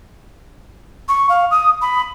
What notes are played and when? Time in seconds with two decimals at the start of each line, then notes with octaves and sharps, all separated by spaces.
1.08 C#6
1.29 F5
1.51 D#6
1.82 B5